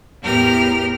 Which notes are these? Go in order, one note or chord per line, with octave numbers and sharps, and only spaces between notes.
E2 A2 G4 A#4 F6